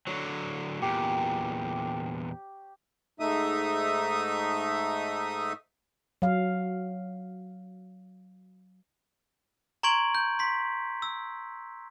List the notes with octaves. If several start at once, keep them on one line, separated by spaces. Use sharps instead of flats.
D3 F#3 C#5
E2 A#2 G4
G#2 A3 D#4 E5 D#6
F#3 F5
A#5 C6 C#6 G#6 D7 F#7
G6
C6 B6
E6